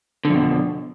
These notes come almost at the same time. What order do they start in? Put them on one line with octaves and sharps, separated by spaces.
D3 F2 B2